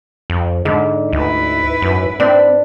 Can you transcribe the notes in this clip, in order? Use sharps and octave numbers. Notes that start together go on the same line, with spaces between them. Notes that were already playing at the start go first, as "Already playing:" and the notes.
F2
G#2 D3
D2 E4 B4
F#2
C4 D4